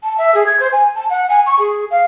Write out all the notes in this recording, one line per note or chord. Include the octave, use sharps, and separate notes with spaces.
A5
E5
G#4
G#6
C5
G#5
A5
F#5
G#5
C#6
G#4
F5